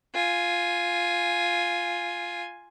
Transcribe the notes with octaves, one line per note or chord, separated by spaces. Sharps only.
F4 G#5